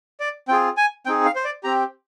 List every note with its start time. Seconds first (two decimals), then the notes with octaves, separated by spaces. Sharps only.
0.20 D5
0.48 C4 F4 G#4 G5
0.77 G#5
1.06 C4 D#4 G#4 G5
1.26 F5
1.36 C5
1.45 D5
1.64 C4 G4 A#5